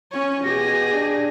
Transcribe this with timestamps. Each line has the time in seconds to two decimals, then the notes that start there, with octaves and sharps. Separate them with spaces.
0.12 C#4 C#5
0.44 B2 G4 G#4 A#6
0.93 D4